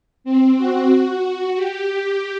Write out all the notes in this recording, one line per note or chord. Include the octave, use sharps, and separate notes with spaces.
C4
F#4
F#4
G4